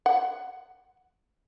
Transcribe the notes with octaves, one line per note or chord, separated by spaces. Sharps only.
F#5